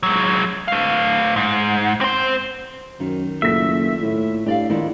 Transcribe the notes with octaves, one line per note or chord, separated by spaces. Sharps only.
F#3 G#3
A3 F5
G#2
C4 C5
F#2 D#3
F#1 A#2 A3 E5 B6
A2
A2 D4 G4 D5 F5
G#2 D#3 F3 D4 E4 F4